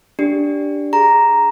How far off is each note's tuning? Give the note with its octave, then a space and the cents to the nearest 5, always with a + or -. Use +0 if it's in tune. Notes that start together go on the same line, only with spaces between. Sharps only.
D4 -5 G4 +0
G#4 +0 A#5 +0